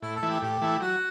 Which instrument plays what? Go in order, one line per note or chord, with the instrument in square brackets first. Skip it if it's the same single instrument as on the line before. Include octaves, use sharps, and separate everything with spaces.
[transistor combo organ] A2 [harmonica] E4
[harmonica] A4
[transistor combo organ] E3 A3 E4
[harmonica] G4
[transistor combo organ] A2 [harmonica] G4
[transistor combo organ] E3 A3 E4
[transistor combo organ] F#3 [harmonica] F#4